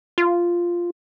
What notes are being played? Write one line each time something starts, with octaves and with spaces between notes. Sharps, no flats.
F4